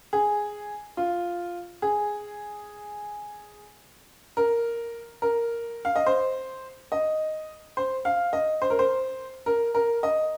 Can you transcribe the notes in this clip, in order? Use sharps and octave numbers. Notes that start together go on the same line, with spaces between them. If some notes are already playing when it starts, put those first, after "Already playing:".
G#4
F4
G#4
A#4
A#4
F5
D#5
C5
D#5
C5
F5
D#5
C5
A#4
C5
A#4
A#4
D#5